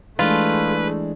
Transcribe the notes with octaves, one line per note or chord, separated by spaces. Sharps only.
E3 G#3 A3 D4 F4 G#4 B4